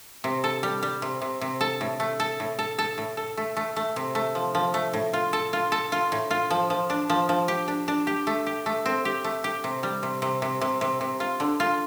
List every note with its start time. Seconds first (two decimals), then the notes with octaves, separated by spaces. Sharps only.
0.24 C3
0.44 A4
0.63 G3
0.83 G3
1.02 C3
1.22 C3
1.41 C3
1.61 A4
1.81 A2
2.00 A3
2.20 A4
2.40 A2
2.59 A4
2.79 A4
2.98 A2
3.17 A4
3.37 A3
3.57 A3
3.76 A3
3.96 C3
4.15 A3
4.35 F3
4.55 F3
4.74 A3
4.93 A2
5.13 F4
5.33 A4
5.53 F4
5.72 A4
5.92 F4
6.12 A2
6.31 F4
6.51 F3
6.70 F3
6.90 D4
7.10 F3
7.29 F3
7.48 G4
7.68 D4
7.88 D4
8.07 G4
8.27 A3
8.46 G4
8.66 A3
8.86 C4
9.05 G4
9.24 A3
9.44 G4
9.64 C3
9.83 G3
10.03 C3
10.22 C3
10.42 C3
10.61 C3
10.81 C3
11.01 C3
11.20 F4
11.40 D3
11.60 F4